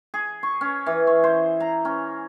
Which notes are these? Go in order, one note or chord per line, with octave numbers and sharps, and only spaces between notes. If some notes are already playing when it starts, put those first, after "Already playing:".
G#4
C#6
C#4
E3
C#5
C5
A#5
C#4